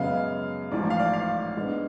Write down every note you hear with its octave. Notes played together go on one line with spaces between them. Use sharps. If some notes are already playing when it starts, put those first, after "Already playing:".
Already playing: F#2 C#3 G#3 B3 F5
A1 G#2 F3 D5
F5
D5
F5
G#2 G#3 B3 D4